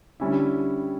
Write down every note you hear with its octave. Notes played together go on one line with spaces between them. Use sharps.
D3 G3 C#4 E4